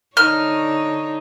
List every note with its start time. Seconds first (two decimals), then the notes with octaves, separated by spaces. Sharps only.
0.17 D3 D#4 C#5 F6